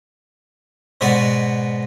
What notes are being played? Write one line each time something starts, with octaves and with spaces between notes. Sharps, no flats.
G#2 B2 F#4 B4 D5